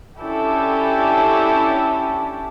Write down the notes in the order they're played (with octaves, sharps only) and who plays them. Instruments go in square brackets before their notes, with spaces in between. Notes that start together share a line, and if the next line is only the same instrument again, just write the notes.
[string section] C#4 D4 E4 G4 A4